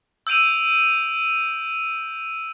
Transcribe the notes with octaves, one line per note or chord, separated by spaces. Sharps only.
E6 G6 D7 D#7 F7